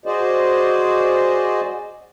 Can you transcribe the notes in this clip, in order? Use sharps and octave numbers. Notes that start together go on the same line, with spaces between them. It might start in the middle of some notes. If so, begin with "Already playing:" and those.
F#4 G#4 C5 D5 D#5